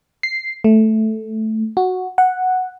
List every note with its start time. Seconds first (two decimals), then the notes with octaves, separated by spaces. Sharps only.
0.23 C7
0.64 A3
1.77 F#4
2.18 F#5